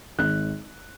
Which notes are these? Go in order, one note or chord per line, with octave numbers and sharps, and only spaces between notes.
G#1 F#6